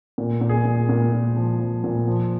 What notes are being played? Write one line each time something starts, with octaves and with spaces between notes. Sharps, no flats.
A#2
A#2
G#4
A#2
A#2
A#2
F3
F3
A#2
F3